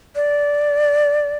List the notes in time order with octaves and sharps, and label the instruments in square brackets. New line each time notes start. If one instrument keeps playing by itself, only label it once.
[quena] D5